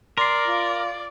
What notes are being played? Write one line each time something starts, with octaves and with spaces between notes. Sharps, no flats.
A#4 D5 C6 C7
F4